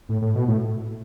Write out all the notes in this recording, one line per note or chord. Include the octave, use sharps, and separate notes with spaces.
A2
A2
B2
A2